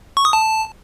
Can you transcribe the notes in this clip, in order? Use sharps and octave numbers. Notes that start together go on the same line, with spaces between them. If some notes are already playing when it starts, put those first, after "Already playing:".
C#6
D#6
A5